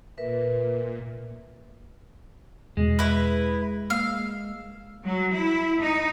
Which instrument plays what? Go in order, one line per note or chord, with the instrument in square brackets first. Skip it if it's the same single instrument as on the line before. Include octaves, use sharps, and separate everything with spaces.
[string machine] A#2 [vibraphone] A#4 B4 E5
[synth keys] E2 B2 [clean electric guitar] G#3
[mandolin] E4 B4
[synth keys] A#3 E6 [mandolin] F5
[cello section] F#3
E4
D#4